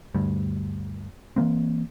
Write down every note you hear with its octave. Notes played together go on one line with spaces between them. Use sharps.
D2 G2
E3 F#3 A#3 C4